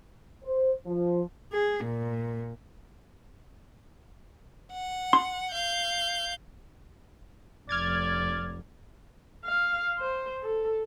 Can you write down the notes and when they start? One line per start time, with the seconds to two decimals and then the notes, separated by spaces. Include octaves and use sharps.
0.44 C5
0.86 F3
1.53 G#4
1.84 A#2
4.72 F#5
5.13 C6
5.51 F5 G6
7.69 F1 D5 F6 G#6 A6
9.45 F5
9.99 C5
10.43 A4